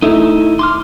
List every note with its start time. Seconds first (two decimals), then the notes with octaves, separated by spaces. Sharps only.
0.02 A3 D#4 E4
0.59 C6 D6 F6